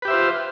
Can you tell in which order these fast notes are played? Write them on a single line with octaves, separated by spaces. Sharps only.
B4 G4 E5 C5 F4